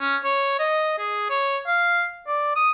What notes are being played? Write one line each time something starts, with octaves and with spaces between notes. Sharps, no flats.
C#4
C#5
D#5
G#4
C#5
F5
D5
D#6